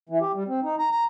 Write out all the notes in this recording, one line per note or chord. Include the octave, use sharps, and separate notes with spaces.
E3
G4
G3
C4
D#4
A#5
A#5